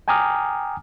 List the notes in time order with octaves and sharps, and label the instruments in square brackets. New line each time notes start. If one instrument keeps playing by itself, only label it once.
[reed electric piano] G5 G#5 A#5 D6 D#6 F6